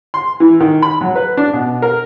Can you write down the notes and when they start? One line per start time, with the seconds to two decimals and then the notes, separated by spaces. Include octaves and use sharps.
0.14 C6
0.40 E3
0.60 D#3
0.82 B5
1.01 F#3
1.16 B4
1.37 D4
1.53 B2
1.82 A#4